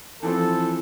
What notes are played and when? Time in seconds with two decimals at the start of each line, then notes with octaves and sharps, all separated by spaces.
0.23 E3 F3 C4 A4